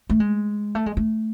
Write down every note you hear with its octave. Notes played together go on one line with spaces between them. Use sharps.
A3
G#3
A3
G#3
A3